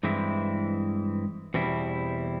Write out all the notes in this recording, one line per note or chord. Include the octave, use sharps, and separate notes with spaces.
G2 E3 G#3 C4 E4
E2 B2 G3 C4 E4